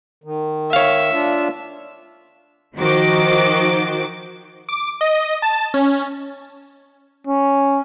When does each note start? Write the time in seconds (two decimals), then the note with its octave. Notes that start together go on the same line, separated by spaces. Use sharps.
0.24 D#3
0.73 C#5 E5 F5
1.13 D4 F4
2.76 D#3 F3 F#4 C5 D6
4.69 D6
5.01 D#5
5.42 A5
5.74 C#4
7.27 C#4